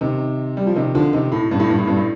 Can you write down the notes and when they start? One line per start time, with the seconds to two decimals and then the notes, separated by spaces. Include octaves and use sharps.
0.01 C3 D#3
0.57 G3
0.67 F3
0.76 C3 D#3
0.95 D3 F3
1.13 C3 D#3
1.32 A2
1.51 G2
1.60 A2
1.70 G2
1.79 A2
1.87 G2
1.97 A2